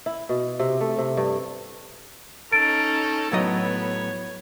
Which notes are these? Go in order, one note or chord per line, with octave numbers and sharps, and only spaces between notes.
E4
B2
C3
A3
C3
G2
C#4 D#4 A4 A6 D7
A2 F#3 B3 C#5 D#5